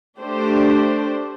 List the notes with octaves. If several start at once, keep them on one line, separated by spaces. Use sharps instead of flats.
A3 D4 G4 C5